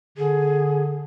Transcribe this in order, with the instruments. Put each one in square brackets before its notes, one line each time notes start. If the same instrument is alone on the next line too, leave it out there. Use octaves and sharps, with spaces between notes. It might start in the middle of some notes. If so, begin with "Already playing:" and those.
[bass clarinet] D3 [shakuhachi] G#4